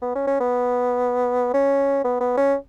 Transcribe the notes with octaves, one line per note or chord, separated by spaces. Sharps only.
B3
C#4
C#4
B3
C#4
B3
B3
C#4